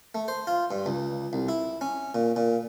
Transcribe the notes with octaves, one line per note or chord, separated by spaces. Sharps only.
A3
C5
F4
G2
C#2
C2
E4
C#4
A#2
A#2